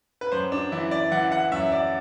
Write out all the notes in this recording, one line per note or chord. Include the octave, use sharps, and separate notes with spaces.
B4
F#2 C5
D4
E3 E4
D5
E3 F#5
F#5
F#2 E5
D5